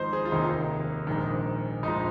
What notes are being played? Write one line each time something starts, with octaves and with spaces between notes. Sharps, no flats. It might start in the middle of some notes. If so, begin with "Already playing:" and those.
Already playing: G#1 G#2 F3 C5 D#5
G#4
F4
F1 D#2 D#3 D#4
A#1 G#2 D#3
A#1 G#2 F3 D#4